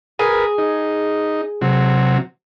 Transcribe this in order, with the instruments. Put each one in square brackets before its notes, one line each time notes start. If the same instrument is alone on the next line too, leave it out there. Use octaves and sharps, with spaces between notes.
[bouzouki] G#4 [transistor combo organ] A#4 B4
[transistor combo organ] D#4
C3 F#3